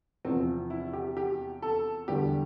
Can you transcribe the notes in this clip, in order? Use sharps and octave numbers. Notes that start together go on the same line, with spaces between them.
E2 C3 F3 C4
E4
G4
G4
A4
E2 D3 G3 G4